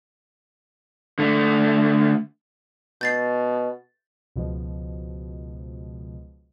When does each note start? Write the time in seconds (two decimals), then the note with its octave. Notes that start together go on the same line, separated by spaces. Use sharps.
1.19 D3 A3
3.01 B2 G6 A6 C7
4.36 C#2 B2 F3